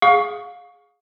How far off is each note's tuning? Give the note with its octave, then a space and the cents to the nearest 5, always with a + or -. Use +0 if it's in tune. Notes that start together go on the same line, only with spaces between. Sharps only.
G#4 +0 F5 +25 C#6 +15